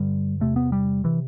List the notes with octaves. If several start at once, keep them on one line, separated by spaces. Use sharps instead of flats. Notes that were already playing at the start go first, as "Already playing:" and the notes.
Already playing: G2 D3 G3
E2 C3 A3
B3
G3
C3 E3